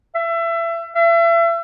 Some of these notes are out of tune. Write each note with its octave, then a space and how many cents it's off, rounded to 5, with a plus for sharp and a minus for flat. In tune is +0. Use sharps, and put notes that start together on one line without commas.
E5 +25
E5 +35